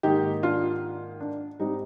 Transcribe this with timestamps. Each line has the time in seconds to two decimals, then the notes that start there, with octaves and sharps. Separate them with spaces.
0.03 G#2 D#3 A#3 D#4 G4
0.43 D4 F4
1.20 D4
1.59 G#2 G3 C4 D#4